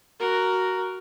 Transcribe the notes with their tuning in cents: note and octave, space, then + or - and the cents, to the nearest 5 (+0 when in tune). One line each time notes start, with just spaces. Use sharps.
F#4 +10 A#4 +0